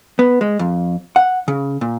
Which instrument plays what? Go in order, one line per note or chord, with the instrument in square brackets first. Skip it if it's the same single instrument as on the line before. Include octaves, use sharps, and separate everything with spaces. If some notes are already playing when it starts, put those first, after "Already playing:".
[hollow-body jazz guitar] B3
G#3
F2
F#5
C#3
A#2